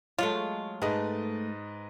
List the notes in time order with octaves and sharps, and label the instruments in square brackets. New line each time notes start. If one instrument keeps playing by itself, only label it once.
[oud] F#3 G#3 A3 [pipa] F4
[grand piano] G#2 B4 D#5 [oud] A3 G#4